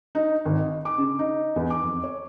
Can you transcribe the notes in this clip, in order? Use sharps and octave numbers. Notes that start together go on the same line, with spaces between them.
D#4
G#1
D#5
D6
C#3
D#4
E2
D6
F2
C#5